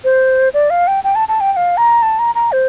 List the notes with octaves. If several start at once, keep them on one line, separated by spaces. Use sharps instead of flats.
C5
D5
F5
G5
G5
A5
A5
G5
G5
F5
A#5
A5
A#5
A#5
C5